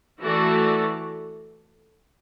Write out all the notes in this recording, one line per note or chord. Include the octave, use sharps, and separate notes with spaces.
E3 A3 F#4 A4 D5